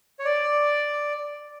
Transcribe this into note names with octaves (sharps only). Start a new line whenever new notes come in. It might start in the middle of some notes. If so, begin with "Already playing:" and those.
C#5
D5